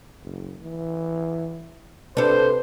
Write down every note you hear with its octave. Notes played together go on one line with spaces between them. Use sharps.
F#1
E3
C3 D4 A4 B4 C5